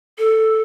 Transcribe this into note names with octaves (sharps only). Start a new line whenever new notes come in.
A4